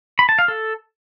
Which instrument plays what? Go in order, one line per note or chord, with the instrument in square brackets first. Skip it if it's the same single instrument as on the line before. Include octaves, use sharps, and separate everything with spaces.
[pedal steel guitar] B5
A5
F5
A4